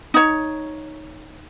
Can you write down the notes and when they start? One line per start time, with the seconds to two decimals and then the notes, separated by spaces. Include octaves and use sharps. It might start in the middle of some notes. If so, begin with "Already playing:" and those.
0.14 D#4 C#5